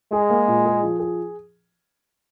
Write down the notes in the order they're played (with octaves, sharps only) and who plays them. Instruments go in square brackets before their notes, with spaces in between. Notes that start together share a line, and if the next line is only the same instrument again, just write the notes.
[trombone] G#3 [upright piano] G#4
[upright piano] A#3
A#2
G#4
F3
G#4